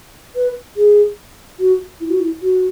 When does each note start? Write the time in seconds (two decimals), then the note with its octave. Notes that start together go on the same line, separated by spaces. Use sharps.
0.35 B4
0.77 G#4
1.59 F#4
2.00 E4
2.10 F#4
2.20 E4
2.42 F#4